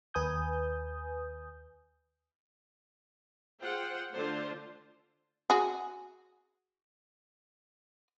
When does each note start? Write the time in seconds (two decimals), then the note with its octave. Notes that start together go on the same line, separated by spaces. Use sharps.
0.14 D#2 B4 G#5 D#6 G6
3.60 F4 G#4 C5 F#5 G5
4.14 D3 A3 D4 F4 C5 A5
5.50 F#4 G#4